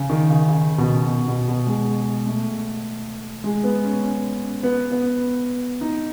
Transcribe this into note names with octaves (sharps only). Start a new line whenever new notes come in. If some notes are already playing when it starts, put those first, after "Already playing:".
Already playing: C#3
D#3
C#3
C#3
B2
B2
B2
G#3
A3
G#3
B3
C#4
C#4
B3
B3
D#4